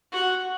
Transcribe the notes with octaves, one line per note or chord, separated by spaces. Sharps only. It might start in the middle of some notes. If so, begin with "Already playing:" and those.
F#4